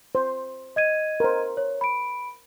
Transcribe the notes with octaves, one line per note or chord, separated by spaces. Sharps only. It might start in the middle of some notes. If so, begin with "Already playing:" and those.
C5
D#5 G#6 D#7
A#4 C5
C#5
B5 D7